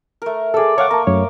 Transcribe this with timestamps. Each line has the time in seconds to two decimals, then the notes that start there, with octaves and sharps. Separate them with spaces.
0.22 A3 A#4
0.54 G#4 A4 D5 E6
0.78 A4 C#5 F5 F#5 C#6 D6
0.91 A#3 A#4 A5 A#5
1.07 F#2 A3 C#5